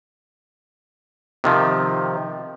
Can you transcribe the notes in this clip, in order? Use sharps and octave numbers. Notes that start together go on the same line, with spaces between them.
C3 D#3 F3